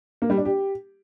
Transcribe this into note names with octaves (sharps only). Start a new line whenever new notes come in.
A#3
G3
D4
G4